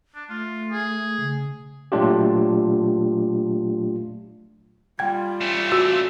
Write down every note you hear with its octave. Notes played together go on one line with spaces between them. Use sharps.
D4
A3 F4
G#4
C#3
A#2 F#3 A3 D4 F4 G4
G3 F4 G5 G#6
A3 C#4
F#4 E6